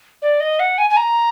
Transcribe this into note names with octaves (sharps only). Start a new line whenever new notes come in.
D5
D#5
F#5
G#5
G#5
A#5